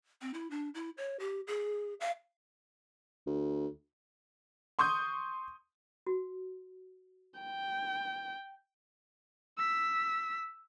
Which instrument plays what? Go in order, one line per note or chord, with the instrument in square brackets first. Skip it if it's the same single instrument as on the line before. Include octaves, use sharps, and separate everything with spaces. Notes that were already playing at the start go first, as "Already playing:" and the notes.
[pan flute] C4
E4
D4
E4
C#5
G4
G#4
F5
[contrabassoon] D2
[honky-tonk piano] C6 C#6 D#6 G6
[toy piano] F#4
[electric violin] G5
E6 B6